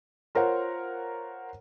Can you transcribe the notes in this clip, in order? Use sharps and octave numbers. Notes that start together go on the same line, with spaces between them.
F4 A#4 C5 C#5 F#5